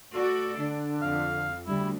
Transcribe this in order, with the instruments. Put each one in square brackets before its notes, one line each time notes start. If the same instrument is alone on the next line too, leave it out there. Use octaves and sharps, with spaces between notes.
[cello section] A3 F#4 D5 [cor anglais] A4
[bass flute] D3 [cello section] D4
[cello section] F2 [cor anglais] F5
[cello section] D2 D3 [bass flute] G3 [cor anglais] E4